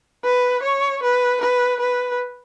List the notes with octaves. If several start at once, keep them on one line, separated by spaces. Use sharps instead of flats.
B4
C#5
B4
B4
B4